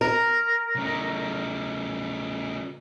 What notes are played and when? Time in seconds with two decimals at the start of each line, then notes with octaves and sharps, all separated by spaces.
0.01 A#4
0.76 C#3 A3